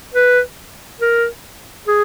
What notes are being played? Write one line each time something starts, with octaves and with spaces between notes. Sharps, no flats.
B4
A#4
G#4